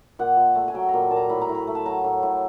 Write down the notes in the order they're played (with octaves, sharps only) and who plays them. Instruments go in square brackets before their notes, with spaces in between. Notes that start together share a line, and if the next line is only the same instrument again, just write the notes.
[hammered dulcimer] A#2 F#5
A#2
A3
G#5
F#3 G5
A#2 A#5
A#2 A5
A#5
A2 B5
A#5
A2
B5
A3
A5
F#3 A#5
A2
A2